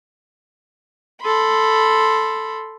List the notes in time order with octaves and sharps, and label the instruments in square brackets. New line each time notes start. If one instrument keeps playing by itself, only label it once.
[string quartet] A4 B5 C6